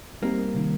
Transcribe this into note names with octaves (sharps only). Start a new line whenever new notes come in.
G3 A#3 C4 D#4 G4 A#4
C3 D#3 G3